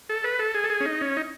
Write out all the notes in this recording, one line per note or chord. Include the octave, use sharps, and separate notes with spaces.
A4
B4
A4
G#4
A4
G#4
C#4
D#4
C#4
D#4